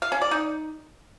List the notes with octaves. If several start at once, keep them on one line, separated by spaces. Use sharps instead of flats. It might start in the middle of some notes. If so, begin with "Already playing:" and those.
F5
C#4
D5
D#4